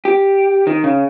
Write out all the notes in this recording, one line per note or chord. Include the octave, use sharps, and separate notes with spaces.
G4
D#3
C#3